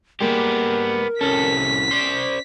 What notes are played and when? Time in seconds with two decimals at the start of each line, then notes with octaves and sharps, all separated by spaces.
0.21 G3 G#3 A#3 B3 G4 A#4
1.21 C2 C#4 A4 B6
1.91 C5 D5